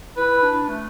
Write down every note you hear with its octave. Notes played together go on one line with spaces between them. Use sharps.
E4 B4
E4
D4
A3